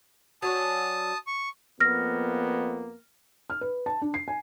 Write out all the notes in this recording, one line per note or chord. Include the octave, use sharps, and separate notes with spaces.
F#3 C#4 D4 A5 D#6
C#6
F2 A#3 B3 F6 A#6
F6
B4
A5
D4
C7
G#5